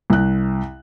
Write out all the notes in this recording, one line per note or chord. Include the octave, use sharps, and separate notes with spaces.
C2 F#6